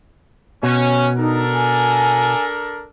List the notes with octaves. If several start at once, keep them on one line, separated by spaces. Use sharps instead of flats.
B2 C#4
D4 D#4 A4 A#4
G#5